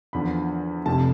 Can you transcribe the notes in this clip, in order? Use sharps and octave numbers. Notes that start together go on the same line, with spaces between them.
E2 D3 F3 B5
F1 F2 C3 A5